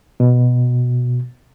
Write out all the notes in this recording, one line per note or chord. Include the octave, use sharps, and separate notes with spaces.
B2